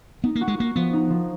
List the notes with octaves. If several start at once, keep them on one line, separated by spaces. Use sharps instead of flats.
B3 D#4
A#3
F#4
G#3
A#3 F#4
F3 B3
D#4
F3